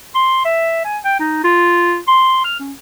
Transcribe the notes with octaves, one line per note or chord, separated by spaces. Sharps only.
C6
E5
G#5
G5
D#4
F4
C6
F6
C#4